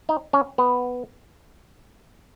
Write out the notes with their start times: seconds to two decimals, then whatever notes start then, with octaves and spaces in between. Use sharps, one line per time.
0.09 D#4
0.33 C#4
0.58 B3